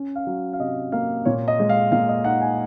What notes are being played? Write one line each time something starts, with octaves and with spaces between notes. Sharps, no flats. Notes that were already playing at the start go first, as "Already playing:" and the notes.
Already playing: C#4
F5
F#3
F5
C3 D#5
A#3 F5
A#2 C#5
D#5
G#3
F5
A#2 F5
D#5
D#4 F#5
G#5